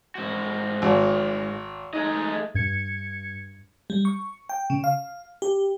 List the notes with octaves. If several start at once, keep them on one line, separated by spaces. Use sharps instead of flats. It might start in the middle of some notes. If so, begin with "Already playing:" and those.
G#2 F#4
G#1
A3 D#4 G#4 D#5
G2 G#6 C#7
G3
C#6
G5
C#3
F5
G4